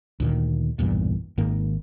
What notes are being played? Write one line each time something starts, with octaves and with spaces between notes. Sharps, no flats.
D2 A#2 D#3
B1 E2 G2 A#2
G#1 G#2 D#3 A#3